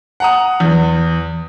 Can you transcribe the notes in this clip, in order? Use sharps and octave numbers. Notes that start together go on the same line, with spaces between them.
F#5 A#5 D#6
E2